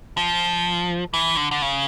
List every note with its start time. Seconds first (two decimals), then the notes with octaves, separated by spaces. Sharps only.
0.17 F3
1.14 E3
1.37 D3
1.51 D3
1.62 C#3